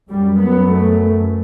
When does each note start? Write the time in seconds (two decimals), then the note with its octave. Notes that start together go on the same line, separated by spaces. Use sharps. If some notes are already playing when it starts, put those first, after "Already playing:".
0.10 F#2 G3
0.39 B3
0.68 A3